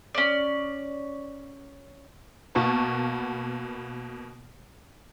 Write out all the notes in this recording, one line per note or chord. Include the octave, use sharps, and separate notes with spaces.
C#4 D5
B2 A#3 B3 A5 C#6